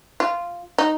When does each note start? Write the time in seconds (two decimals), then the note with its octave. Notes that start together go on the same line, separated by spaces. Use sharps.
0.20 F4
0.78 D#4